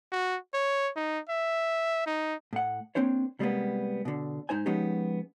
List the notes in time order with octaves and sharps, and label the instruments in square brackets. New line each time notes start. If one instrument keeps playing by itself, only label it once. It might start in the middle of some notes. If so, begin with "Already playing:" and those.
[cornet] F#4
C#5
D#4
E5
D#4
[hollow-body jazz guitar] A2 F#5
A#3 C4 D4 C5 C#5
C3 G3 G#3 A#3 B3
B2 D3
G#2 D#4 C5 G#5
F3 G#3 B3 C#4 D#4 G4